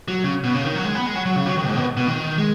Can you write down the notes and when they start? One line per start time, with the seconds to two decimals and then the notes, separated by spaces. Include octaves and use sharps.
0.08 F#3
0.24 C#3
0.44 B2
0.55 C#3
0.64 D#3
0.75 F#3
0.84 G#3
0.95 B3
1.06 G#3
1.15 F#3
1.26 F#3
1.36 C#3
1.46 F#3
1.57 D#3
1.66 G#2
1.76 B2
1.97 B2
2.07 D#3
2.38 G#3